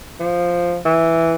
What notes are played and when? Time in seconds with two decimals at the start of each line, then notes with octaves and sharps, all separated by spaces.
0.20 F3
0.86 E3